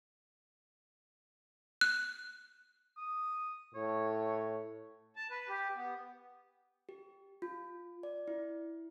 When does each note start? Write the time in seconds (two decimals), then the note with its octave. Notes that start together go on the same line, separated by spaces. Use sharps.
1.81 F#6
2.97 D#6
3.75 A2 C#5
5.16 A5
5.30 B4
5.49 G4
5.75 B3
6.89 G4
7.42 F4
8.03 D5
8.28 E4